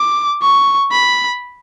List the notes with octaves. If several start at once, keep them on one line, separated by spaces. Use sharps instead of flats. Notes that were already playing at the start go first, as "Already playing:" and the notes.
Already playing: D6
C#6
B5